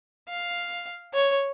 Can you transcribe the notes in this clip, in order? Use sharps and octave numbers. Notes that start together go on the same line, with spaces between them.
F5
C#5